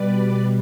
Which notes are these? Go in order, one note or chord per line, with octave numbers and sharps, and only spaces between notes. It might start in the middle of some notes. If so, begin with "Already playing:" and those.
Already playing: B2 G3 B4 D5